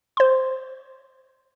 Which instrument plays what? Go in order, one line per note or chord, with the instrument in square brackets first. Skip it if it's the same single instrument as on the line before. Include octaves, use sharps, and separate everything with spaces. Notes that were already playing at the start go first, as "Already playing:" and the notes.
[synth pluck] C5 C6